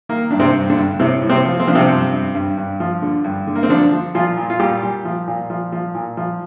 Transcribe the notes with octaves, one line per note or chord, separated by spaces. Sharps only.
D#3 A#3
G2 D4
C3 C4
G2
D3 D4
G2
A2 C3 C4
A2
C3 C4
F3
C4
F3 D4
C3 C4
G2
G2
G2
G2
F3
D3
G2
D3
A#3
C4
D3 F3 D4
F3
A#2 F3 F4
A#2
F4
A#2 G3 G4
A#2
F3
A#2
F3
F3
A#2
F3